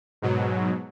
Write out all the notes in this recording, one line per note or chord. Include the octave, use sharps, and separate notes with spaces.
G#2 B2 F#3